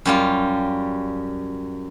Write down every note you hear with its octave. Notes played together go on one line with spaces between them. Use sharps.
F#2 G3 F4